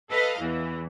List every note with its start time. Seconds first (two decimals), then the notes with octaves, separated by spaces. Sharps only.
0.10 A4 B4 D#5 F5
0.39 E2 E3